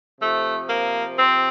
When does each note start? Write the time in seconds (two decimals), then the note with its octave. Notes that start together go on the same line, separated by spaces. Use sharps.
0.21 C3 F3 A3
0.69 A#3
1.18 C4